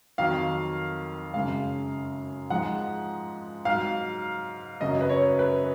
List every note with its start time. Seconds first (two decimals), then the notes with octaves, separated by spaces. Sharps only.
0.18 F2 D#3 F#3 F5
1.34 F#2 C#3 G#3 F5
2.50 G#2 F3 G#3 F#5
3.65 G#2 F#3 F5
4.81 F#2 C#3 F#3 D#5
5.01 B4
5.09 C#5
5.39 B4